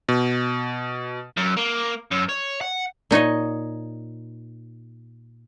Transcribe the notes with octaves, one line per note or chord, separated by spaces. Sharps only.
B2
F#2
A#3
F#2
C#5
F#5
A#2 D#4 C#5 D#5